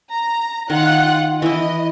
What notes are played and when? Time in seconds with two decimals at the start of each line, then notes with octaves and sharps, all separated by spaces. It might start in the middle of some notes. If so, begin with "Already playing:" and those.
0.11 A#5
0.70 D#3 F4 F#5 F#6
1.42 E3 E4 D#5